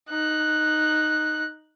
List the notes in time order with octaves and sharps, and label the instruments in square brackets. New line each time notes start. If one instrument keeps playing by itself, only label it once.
[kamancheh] D#4 F#6